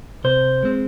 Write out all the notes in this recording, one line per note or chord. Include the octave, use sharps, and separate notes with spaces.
C3 C5
G#3 C4